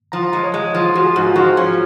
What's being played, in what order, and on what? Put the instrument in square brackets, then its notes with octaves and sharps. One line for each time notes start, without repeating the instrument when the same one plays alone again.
[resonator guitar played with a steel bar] F3 [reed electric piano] A#5
[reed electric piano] A#5
[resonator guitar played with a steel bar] G#3
[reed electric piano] C#5
[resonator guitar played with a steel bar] G#3
F3
[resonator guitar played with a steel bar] F3 [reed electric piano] F#4
[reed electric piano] G#4
[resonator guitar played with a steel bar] G#2 [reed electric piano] F#4
[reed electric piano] F4
[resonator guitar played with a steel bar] F3 [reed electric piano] F#4
[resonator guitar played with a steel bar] C#4